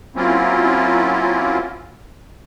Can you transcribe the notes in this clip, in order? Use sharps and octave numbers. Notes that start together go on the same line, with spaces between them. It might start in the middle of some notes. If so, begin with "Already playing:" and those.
F#3 A#3 C4 C#4 E4 F4